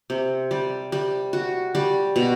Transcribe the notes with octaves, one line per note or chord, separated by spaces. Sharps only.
C3
G3
G3
F#4
G3
B2